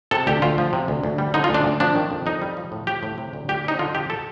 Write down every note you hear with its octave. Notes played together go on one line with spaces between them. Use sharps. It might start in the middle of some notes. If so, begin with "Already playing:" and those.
C3 A4
D2 G4
D2 F4
F3
C3
D2
D2
G3
D3 D#4
F4
D2
D4
D2
F3 D4
D#3
F2
F2 D#4
G3
F3
A2
F3 G4
A2
C3
D2
D2 G4
G3 D#4
D3 F4
F2 G4
A4